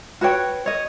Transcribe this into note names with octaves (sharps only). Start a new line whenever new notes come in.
F#4 B4 C#5 G5
C#5 D#5